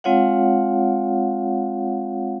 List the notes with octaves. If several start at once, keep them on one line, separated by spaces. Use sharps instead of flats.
G#3 C4 F4 C#5 F5 F#5